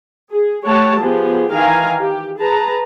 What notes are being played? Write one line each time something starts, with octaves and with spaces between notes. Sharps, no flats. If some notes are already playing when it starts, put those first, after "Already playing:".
G#4
A3 G4 C#5 F#5 A5
F3 B3 G4 G#4
D#3 E3 F5 G#5 A#5
G4
G#4 B4 A5 A#5